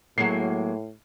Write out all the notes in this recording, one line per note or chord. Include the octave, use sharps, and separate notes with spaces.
A2 F#3 G#3 A#3 C7